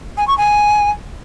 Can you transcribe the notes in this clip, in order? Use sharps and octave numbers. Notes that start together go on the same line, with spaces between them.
G#5
C#6
G#5